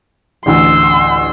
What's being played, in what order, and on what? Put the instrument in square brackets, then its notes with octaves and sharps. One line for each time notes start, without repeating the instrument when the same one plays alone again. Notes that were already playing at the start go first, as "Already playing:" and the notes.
[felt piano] A1 D2 [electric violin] C6 E6